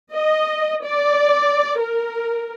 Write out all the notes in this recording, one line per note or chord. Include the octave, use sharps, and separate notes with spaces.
D#5
D5
A#4